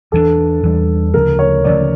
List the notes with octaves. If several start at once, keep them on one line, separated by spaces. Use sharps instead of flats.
E2 E3 G3 D4 A4
E2 E3 G3 D4
D2 C#3 F3 A3 A#4
C#5
D2 C#3 F3 A3 D5